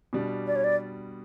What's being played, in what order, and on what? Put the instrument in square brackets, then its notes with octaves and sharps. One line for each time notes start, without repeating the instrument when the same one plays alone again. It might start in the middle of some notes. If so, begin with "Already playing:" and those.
[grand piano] B2 G3 D4
[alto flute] D5
C#5
D5